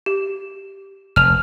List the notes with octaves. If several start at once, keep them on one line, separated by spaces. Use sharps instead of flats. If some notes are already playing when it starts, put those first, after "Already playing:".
G4
F1 F6 F7